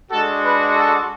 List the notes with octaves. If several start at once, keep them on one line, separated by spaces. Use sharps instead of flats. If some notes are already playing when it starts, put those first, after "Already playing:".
G#3 D4 F#4 A4
B4
A4